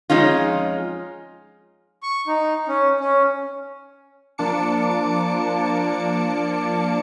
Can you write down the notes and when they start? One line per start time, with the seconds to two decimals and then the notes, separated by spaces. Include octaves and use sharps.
0.10 F2 G#3 C#4 D#4 F4
2.03 C#6
2.27 D#4
2.68 C#4
3.00 C#4
4.38 F3 A#3 D4 A5 D6 C#7